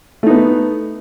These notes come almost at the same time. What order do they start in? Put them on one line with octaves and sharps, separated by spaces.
A3 D#4 B3